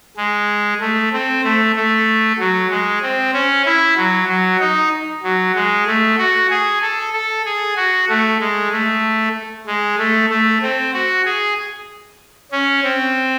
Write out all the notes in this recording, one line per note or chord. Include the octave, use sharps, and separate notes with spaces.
G#3
A3
C4
A3
A3
F#3
G#3
C4
C#4
E4
F#3
F#3
D#4
F#3
G#3
A3
F#4
G#4
A4
A4
G#4
F#4
A3
G#3
A3
G#3
A3
A3
C4
F#4
G#4
C#4
C4